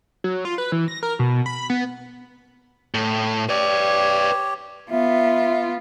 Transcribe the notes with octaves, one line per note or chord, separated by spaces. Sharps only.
F#3
F4
B4
E3
A#6
A#4
B2
B5
B3
A2
G4 B4 C#5 D5
B3 F4 E5